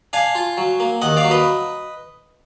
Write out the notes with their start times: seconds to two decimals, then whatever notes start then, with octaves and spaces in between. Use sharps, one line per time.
0.13 D4 F5 G#5
0.35 F4
0.58 F#3
0.80 A#3
1.02 D#2 D#5 F#5
1.17 D5 F5
1.24 F#3
1.31 B4 D#5